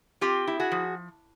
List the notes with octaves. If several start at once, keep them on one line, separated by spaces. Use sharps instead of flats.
C4 F4 G4
E4
F#4 G#4
F3